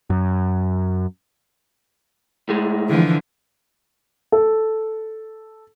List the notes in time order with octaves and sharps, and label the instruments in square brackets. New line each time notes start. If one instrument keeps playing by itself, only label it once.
[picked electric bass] F#2
[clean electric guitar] A2 G#3
[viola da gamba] D3 E3 F3
[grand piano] A4